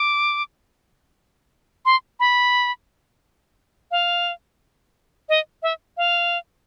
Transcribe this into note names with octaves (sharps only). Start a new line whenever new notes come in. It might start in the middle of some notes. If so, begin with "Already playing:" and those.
Already playing: D6
C6
B5
F5
D#5
E5
F5